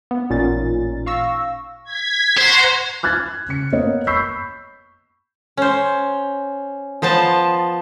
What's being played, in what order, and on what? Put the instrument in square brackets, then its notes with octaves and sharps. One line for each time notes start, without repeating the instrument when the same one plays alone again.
[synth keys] B3
A1 A#2 C#4 D#4 A6
F5 C#6 E6 A#6
[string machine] G#6 B6
[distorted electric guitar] C5 [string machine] F#5 A#5 C#6
[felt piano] F6 F#6 G#6 A6
C#3 C#7
A#3 B3 A#4 C#5 D#5
B5 C#6 E6 G6 B6 C7
[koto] C#4 C5
F3 B3 C5 A5